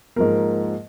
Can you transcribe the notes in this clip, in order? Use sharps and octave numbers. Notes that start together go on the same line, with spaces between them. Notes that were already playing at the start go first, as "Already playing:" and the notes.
G#2 F3 A#3 A#4